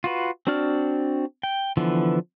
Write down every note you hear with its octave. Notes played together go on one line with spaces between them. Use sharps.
F4 F#4 B4
C4 D4 F#4 D5 F6
G5
D3 E3 F3 B3